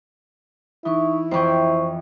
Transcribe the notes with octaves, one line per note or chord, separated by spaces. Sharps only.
E3 D#4 E4 C#6
F2 E3 C5 G5 C#6